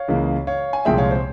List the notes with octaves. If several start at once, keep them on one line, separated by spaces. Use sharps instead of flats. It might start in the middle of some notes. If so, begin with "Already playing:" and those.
Already playing: C#5 F5
C#2 C#3 E3 A#3
C#5 F5
G#5
C2 A#2 F3 G#3 E5 G5
C#5 F5
C5